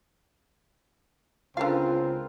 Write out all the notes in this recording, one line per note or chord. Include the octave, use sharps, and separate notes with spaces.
C#2 D3 C4 F4 A#4 B4 F5